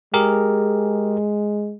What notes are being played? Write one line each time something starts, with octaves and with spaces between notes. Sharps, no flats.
G#3 G4 G#4 A#4